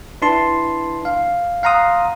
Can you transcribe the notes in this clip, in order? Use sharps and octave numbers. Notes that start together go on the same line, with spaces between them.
D4 E4 B4 A5 C6
F5
F5 F#5 A#5 C6 D#6